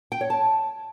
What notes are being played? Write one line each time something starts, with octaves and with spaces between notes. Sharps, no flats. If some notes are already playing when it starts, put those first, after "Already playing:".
G5
C#5
A5